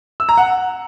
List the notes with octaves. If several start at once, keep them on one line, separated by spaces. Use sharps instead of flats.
E6
A#5
F#5